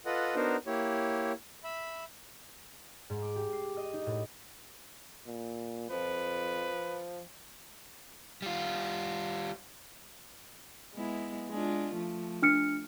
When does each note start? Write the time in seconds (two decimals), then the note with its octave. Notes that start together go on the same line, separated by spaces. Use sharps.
0.06 F4 A4 B4 D#5 F#5
0.36 B3 D4 D#4 F#4 A#4 C5
0.67 A#3 E4 G4 C#5
1.64 E5 B5
3.10 G#2
3.22 D6
3.36 G4
3.53 C7
3.77 D#5
3.93 D#4
4.06 A2
5.26 A#2
5.91 F2 F3 B4
8.42 G3 F4
10.95 G#3 B3 E4
11.50 G#3 D4 F4
11.94 F3 A3
12.42 D4 F6 C#7